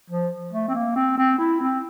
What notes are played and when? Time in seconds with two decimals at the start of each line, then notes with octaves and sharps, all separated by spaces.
0.10 F3
0.53 A3
0.68 C4
0.75 A#3
0.96 C4
1.18 C4
1.39 E4
1.61 C4